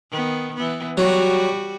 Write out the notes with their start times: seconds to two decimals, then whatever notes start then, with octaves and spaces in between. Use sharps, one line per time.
0.11 D#3 B3
0.56 E3 B3
0.98 F#3 G3 F#4